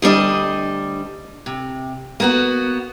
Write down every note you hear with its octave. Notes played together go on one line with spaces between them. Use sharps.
D2 G3 D4 D#5
C3
A#3 B3 F#4